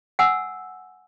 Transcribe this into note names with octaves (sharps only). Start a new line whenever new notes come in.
F#5 G#5 E6